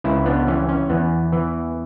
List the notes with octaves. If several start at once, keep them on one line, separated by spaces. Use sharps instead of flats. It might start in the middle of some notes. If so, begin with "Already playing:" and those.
C#2 C#4 E4
B3 D4
E3 C#4
C#4
E2 B3
E3